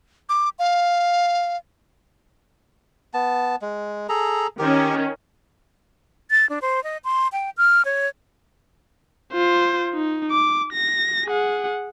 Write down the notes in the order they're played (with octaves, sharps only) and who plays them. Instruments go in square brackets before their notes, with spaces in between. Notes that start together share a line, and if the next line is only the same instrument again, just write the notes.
[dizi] D6
F5
[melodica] B3 A5
G#3
G#4 A4 A#5
[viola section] D#3 C#4 [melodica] G4 A#4
[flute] A6
D4
C5
D#5
C6
G5
F6
C#5
[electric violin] F4 C5
D#4
D6
A#6
G#4 F#5